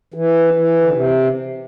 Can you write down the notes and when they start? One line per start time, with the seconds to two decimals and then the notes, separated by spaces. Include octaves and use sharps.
0.14 E3
0.54 E3
0.81 D3
0.93 C3